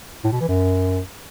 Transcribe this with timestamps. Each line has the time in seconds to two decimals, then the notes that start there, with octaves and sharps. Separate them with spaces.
0.24 A2
0.32 B2
0.40 E3
0.48 F#2